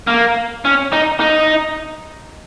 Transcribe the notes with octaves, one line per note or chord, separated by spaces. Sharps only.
A#3
C#4
D#4
D#4